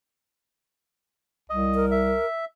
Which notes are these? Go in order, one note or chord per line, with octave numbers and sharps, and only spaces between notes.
C2 D#5
A#4
E5